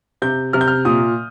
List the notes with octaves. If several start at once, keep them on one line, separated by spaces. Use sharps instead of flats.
C3 G6
C3 F6
G6
F6
A#2 D#6